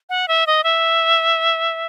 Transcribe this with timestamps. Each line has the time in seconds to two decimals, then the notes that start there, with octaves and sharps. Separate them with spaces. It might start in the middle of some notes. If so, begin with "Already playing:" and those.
0.09 F#5
0.28 E5
0.47 D#5
0.64 E5